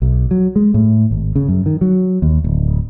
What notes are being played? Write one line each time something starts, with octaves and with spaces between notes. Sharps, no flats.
B1
F#3
G#3
A2
G#1
C#3
F#2
D#3
F#3
D#2
D1